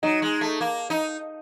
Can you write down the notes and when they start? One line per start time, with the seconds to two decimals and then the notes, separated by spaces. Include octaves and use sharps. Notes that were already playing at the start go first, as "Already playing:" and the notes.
0.03 F#3 D#4
0.22 G#3
0.41 A3
0.61 A#3
0.90 D#4